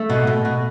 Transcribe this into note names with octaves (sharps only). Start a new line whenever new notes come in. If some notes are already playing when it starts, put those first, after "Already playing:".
Already playing: A3
B2
B2
B2